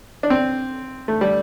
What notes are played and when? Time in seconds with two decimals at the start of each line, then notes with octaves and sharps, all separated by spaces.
0.23 D4
0.30 C4
1.08 A3
1.21 G3